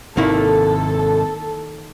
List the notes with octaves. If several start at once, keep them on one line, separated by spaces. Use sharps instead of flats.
G#1 C3 D#3 A#3 E4 A4